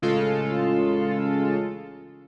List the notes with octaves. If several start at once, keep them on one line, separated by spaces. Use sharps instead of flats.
A1 C#3 G#3 F4 A4